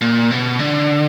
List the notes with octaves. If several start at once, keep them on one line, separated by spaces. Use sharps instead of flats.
A#2
B2
D3